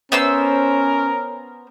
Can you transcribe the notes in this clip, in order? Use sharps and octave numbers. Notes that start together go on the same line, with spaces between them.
B3 C#4 A#4 C5 E6